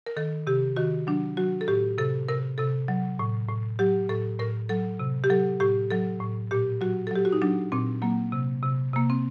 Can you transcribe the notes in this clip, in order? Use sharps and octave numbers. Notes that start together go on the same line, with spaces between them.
A#4
D#3 A4
C3 G4
D#3 F#4
F#3 D4
F#3 F#4
A4
A2 G4
C3 A4
C3 A#4
C3 A4
F#3
A2
A2
F#3 G4
A2 A4
A2 A#4
F#3 A4
C3
G4
F#3 A4
A2 G4
F#3 A4
A2
A#2 G4
F#3 F#4
A4
F#3 G4
F#4
D#4
F#3 D4
A#2 C4
F#3 A#3
C3
C3
C3 A#3
C4